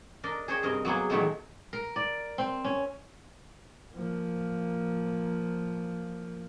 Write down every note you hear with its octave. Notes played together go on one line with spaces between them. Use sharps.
D4 A#4 D5 D#5
G#4 C5 C#5 D#5 G5 G#5
G2 C3 A#4 D#5
F#3 A#3 B3 G#4
A#2 D#3 E3 F#3 G#3 A3
A#4
D5
C4
C#4
F3 A#3